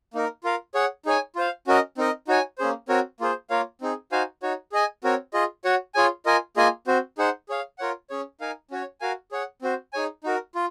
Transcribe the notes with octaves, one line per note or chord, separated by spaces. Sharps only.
A#3 D#4 A#4
F4 A#4 F5
G#4 C#5 F#5
D#4 G#4 C#5 G#5
F4 C5 F5
C#4 F#4 A#4 D#5
C4 D#4 A#4 D#5
D#4 F#4 C#5 G#5
A#3 C#4 G#4 C5
C4 F#4 A#4 C#5
A#3 F4 G#4 C5
A#3 F4 A#4 C#5 F5
C4 D#4 G#4
D#4 F#4 C5 F5 G#5
D#4 F#4 C#5
G#4 D#5 G#5
C4 F#4 A#4 C#5
F4 G#4 D#5
F#4 C#5 F#5
F4 G#4 C#5 G#5
F4 A#4 D#5 G#5
A#3 F4 G#4 D#5 G#5
C4 F#4 C5
D#4 G#4 C5 F#5
G#4 C#5 F5
F4 A#4 C#5 F#5
C#4 G#4 C#5
D#4 A#4 F5 G#5
C#4 F#4 C#5
F#4 A#4 F5 G#5
G#4 C#5 F#5
C4 F#4 C5
D#4 G#4 C#5 G#5
D#4 F#4 A#4
F4